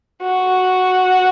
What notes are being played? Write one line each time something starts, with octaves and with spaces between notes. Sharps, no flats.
F#4